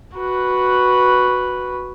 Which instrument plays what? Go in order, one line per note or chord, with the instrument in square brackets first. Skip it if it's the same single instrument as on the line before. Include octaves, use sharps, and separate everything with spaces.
[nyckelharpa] F#4 B4